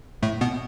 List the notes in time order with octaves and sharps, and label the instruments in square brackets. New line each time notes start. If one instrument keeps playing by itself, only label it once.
[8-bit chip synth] A2 A3
B2 B3